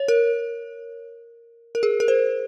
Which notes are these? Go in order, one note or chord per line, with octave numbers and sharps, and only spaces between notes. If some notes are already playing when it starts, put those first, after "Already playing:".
Already playing: C#5
A#4
A#4
G#4
A#4
C5